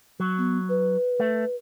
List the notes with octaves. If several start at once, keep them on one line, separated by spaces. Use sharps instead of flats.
F#3
B3
B4
A3